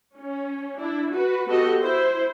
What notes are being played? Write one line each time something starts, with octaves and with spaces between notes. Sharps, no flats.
C#4
D4 E4
F#4 B4
B3 F#4 G4 A4 D#5
E4 C5